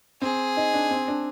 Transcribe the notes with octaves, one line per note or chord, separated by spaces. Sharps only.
C4 G#4
D#4
D4
C4
D4